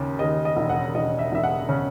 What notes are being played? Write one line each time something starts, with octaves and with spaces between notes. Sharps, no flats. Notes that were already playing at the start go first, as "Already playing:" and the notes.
Already playing: D#2 C#3
D#2 D#5
D#5
E1
F#5
E1 D#5
E5
E1 E5
F#5
C#3